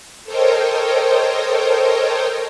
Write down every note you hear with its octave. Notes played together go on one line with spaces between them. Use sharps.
A4 A#4 C5 C#5 D#5 G5